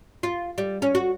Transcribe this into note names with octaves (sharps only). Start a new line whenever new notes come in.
F4
G3
C#4
F#4